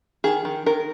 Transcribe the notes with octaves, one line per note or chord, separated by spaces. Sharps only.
D#3 G#4
D#3
D#3 A#4